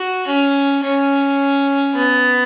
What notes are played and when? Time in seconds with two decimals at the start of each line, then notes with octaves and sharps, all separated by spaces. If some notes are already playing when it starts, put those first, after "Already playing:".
Already playing: F#4
0.27 C#4
0.83 C#4
1.95 B3